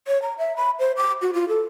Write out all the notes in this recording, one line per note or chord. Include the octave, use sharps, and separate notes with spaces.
C#5
A#5
E5
B5
C5
D6
F#4
F4
A4